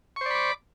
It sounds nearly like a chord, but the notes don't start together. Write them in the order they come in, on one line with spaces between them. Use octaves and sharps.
C#6 C5 D5 B5 D6